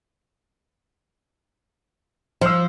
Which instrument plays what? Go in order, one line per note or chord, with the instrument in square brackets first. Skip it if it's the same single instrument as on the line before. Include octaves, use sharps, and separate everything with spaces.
[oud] F3 [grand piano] C5 E6